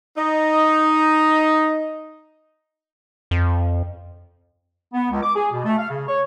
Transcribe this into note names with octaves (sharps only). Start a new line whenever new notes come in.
D#4 D#5
F2
B3
C#2
D6
G#4
B2
A3
F5
C#3
C#5